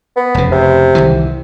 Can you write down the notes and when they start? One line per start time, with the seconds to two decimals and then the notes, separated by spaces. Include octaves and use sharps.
0.16 B3
0.34 F1 C#3
0.52 C3
0.95 C2 D#3 E3